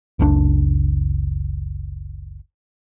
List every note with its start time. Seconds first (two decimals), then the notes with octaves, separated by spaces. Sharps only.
0.19 F#1 C#2 D4